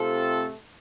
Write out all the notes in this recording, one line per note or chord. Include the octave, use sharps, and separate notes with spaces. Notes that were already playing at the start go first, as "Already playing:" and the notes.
Already playing: C3 A3 C4 F4 A4